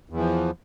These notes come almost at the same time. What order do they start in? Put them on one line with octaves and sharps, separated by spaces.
E2 E3 F3